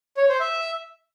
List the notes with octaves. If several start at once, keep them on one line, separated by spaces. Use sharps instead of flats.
C#5
C5
E5